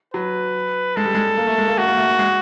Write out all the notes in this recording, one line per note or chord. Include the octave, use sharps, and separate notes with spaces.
F#3 B4
G#3 A4
G3
G#3
A#3
A3
G#3
A#3
A3 F#4
A#3
A3
G#3